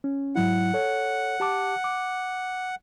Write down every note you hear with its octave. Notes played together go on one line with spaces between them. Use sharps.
C#4
G#2 F#3 E4 F#5
A4 C#5
G4 A5 D6
D6